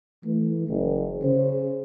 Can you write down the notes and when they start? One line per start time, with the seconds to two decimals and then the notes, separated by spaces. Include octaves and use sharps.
0.24 E3 A3
0.68 F#1
1.24 C#3 C5